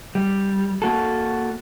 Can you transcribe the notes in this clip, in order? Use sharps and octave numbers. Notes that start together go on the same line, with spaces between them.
G3
A#3 F#4 A4